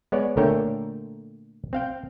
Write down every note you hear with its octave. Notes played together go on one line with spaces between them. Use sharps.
G#3 B3 C#5 D5
A#2 D3 A3 A#4 C#5 G5
C4 F5 G5